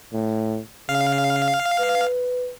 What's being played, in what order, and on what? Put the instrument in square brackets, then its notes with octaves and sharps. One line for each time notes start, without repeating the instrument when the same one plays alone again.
[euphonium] A2
[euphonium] C#3 [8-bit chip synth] F5
[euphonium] B4